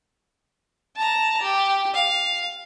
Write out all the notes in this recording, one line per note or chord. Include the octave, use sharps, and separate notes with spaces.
A5 A#5
G4
F5